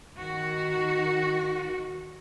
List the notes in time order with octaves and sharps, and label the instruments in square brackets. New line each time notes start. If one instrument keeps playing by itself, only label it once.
[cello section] D#3 F#4